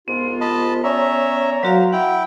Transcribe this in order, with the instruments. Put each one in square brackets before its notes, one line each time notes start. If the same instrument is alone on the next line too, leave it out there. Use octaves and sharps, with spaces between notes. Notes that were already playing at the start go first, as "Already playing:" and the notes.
[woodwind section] C2 G#2 F4 [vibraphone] B3
[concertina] D#5 A5 B5
[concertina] C#4 E5 [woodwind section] C#5 D5 A#5
[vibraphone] F#3 F#4 F5 [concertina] A#4 C5
[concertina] E4 G5 [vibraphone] F#5